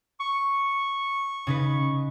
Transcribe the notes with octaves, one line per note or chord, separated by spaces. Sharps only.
C#6
C#3 D#4 B4